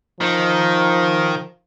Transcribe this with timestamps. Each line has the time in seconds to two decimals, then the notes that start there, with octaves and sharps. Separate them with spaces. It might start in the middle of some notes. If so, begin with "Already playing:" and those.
0.21 D#3 F3